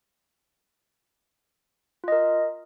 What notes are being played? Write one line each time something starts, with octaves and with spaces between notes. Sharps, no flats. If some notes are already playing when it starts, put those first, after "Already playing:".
F4 A#4 D#5